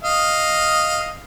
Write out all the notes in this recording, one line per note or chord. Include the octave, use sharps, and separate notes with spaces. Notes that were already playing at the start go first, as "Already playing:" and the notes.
D#5 F5